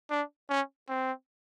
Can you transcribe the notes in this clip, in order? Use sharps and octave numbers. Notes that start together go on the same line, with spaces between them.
D4
C#4
C4